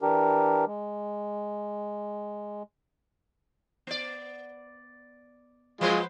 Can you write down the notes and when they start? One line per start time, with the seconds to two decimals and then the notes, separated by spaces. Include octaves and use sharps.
0.02 E3 D4 G4 A#4
0.66 G#3
3.87 B3 D5
5.81 F3 G#3 F4 B4 C5